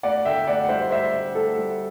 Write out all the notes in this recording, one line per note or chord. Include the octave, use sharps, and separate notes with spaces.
D2 D5 F#5
D3 E5 G5
D2 D5 F#5
F#5
G3 C5 E5
D2 C5 E5
D3
D2 A4
G3